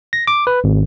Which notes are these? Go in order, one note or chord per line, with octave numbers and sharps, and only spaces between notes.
A#6
D6
B4
G#1